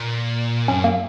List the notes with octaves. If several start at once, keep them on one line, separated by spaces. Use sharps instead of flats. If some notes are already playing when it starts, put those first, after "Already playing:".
Already playing: A#2
F#2 C#4
A#3